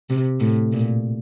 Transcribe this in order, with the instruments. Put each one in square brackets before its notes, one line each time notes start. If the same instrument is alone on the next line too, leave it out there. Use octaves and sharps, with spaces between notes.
[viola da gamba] C3
A2
A#2